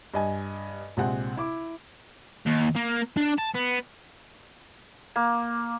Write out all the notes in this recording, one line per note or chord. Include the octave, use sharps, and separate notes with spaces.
G2 D#5 G#5
A#1 C3 G#3 C4 F#5
E4 D6
D#2
A#3
D4
A5
B3
A#3